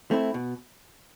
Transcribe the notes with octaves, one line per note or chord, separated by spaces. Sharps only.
A3 C4 E4
B2